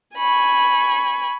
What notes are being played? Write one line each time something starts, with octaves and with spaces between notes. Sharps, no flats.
G#5 B5 C#6